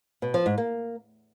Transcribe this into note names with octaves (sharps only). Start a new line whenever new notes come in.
B2
F3
G#2
A#3